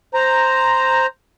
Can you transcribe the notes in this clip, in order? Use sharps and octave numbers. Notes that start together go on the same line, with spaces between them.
C5 A#5